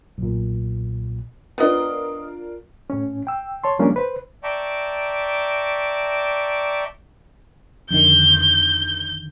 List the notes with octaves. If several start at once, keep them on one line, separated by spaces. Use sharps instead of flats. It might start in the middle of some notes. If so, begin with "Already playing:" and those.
B1 A#2
B3 D4 F4 A#4 D#5
A2 C#4
G5 E6
C#5 A5 C6
F3 G3 G#3 A#3 C#4 D4
B4 C5
D5 E5 G5 A5 A#5 C#6
F2 D3 D#3 G6